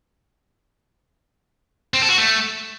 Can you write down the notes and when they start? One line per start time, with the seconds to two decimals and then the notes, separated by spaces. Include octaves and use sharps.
1.94 C4
2.02 A4
2.10 F#4
2.18 A3